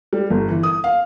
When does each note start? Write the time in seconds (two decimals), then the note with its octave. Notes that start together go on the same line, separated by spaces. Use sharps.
0.13 G3
0.31 G1
0.48 E3
0.63 D#6
0.84 F5